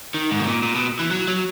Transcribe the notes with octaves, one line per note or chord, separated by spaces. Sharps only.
D#3
G#2
B2
A#2
A#2
B2
E3
F#3
F#3